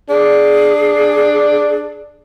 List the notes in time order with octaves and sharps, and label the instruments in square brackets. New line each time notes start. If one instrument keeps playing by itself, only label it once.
[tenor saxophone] D4 [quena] G#4